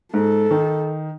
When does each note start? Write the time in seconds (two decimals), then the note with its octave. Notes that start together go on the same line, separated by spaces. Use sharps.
0.14 G#2 A4
0.51 D#3 D#4